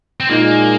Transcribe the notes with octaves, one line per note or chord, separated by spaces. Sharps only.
C4
A#2 G#3 A#3 D#4